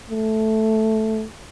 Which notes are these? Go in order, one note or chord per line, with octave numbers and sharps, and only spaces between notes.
A3